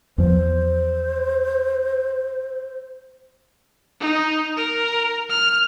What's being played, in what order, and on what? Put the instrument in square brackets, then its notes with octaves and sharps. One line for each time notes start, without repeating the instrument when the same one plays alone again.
[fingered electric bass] E2 F3 [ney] C5
[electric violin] D#4
A#4
F6